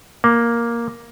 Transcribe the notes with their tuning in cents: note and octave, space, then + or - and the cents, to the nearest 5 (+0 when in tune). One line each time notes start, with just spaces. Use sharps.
A#3 +5